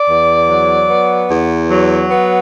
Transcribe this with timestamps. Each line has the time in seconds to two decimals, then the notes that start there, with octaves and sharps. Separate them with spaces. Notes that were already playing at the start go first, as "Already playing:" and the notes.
Already playing: D5
0.08 E2
0.49 F#3
0.89 B3
1.30 E2
1.71 F#3
2.11 B3